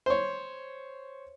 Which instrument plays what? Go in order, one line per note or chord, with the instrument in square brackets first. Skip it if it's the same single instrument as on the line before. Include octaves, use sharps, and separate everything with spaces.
[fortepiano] C5 C#5